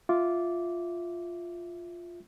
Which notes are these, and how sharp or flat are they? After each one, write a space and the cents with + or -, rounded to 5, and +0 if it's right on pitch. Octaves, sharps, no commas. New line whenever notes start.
F4 +0 E5 +0 D6 -10